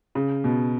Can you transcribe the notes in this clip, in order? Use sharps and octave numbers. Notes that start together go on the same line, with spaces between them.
C#3
B2